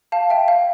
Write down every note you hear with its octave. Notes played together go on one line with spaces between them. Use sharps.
F5 A5
E5 G5
F5